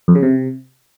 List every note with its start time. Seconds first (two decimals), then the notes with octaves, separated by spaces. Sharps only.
0.08 F2
0.15 C#3
0.22 C3